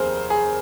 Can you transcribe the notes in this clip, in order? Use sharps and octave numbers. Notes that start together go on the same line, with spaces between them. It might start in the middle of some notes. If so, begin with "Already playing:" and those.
Already playing: F1 D#2 G#4 A#4 C5
G#4